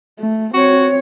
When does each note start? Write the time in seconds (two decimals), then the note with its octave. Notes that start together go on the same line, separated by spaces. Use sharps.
0.19 A3
0.54 C4 F#4 C#5